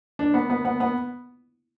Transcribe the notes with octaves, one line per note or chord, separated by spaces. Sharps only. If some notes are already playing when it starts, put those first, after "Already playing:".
D4
B3
B3
B3
B3